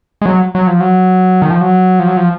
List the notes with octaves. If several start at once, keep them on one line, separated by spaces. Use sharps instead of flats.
G#3
F#3
F#3
F3
F#3
D#3
F3
F#3
F3
F#3
F3